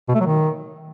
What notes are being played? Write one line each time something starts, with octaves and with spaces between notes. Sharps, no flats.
B2
A3
F#3
D#3